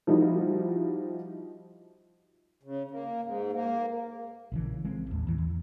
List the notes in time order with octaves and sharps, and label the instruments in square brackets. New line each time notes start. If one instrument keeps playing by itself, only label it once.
[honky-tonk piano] F3 G3 D#4 E4 F#4
[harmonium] C#3
A#3
G#2
A#3
[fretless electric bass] A#1 C#3 E3
G#3 C4
A1 D#2
E2 E3
E2